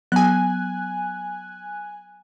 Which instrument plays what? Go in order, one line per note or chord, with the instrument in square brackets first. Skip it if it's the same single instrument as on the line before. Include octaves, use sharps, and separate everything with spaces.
[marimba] F#3 B3 [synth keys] G#5 F#6